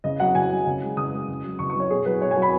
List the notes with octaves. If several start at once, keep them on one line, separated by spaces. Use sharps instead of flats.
C#3 D#5
F#3 F#5
C#3 G#5
F#3
C#3
G#3
C#3 D#6
G#3
C#3
F#3
C#3 C#6
C#6
F#3 C#5
B2 G#4
F#3 B4
B2 C#5
G#5
F#3
B5